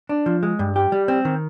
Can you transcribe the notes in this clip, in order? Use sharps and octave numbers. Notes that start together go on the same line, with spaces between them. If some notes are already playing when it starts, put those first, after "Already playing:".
D4
F3
G#3
G2
G4
G3
C4
D#3